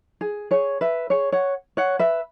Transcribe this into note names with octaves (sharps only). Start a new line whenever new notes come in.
G#4
G#4 C#5
B4 E5
G#4 C#5
C#5 F#5
C#5 F#5
B4 E5